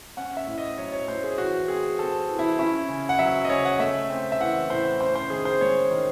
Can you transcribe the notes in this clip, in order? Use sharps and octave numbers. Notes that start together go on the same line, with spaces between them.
C#4 F#5
E5
A2
D#5
F#3 C#5
C#5
A2 C5
G#4
E3 F#4
C4 G#4
C4 A4
E3
E4
C#4 E4
C#3
F#5
F#3 E5
D#5
C#3 C#5
F#5
A3 E5
C4
E5
E3 F#5
A2 C5
C#4 C5
C5
D#3 G#4
C5
G#3 C#5
D#3